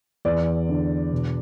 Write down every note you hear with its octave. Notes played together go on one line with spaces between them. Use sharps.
E2 D5
D3
B2